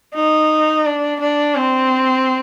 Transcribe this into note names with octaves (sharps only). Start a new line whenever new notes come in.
D#4
D4
D4
C4